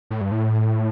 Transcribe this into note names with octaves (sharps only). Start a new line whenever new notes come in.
A2
G2
A2